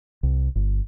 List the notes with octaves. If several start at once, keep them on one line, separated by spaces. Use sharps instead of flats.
C2
G1